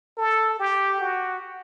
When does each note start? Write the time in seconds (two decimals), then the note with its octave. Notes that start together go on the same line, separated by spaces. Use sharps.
0.18 A4
0.59 G4
1.00 F#4